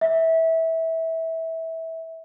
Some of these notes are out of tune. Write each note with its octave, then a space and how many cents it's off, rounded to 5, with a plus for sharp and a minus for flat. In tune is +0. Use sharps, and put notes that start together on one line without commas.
E5 -20